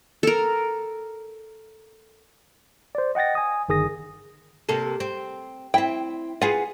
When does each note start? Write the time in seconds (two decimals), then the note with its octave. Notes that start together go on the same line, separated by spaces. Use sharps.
0.23 A4 A#4
2.95 C5 D5
3.15 D#5 F#5 G5 A6 A#6
3.35 G#5 D#6
3.69 G1 D#3 G#4 D#6 A#6
4.69 C3 A#3 A4
5.00 C4
5.74 C4 E4 G5
6.42 F4 G#4 B4 F#5